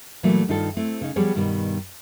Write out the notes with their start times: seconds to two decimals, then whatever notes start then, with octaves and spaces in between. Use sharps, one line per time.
0.23 A#2 E3 F#3 G3 A3 A#3
0.48 G2 D#3 D#4 F4 A4
0.77 A3 C4 E4
1.01 C#3 D#4
1.16 F3 G3 B3 G4 G#4 C#5
1.35 G2 B2 D#3 G3